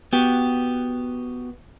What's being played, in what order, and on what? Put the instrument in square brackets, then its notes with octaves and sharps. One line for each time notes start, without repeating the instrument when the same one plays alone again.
[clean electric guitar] B3 F#4 G4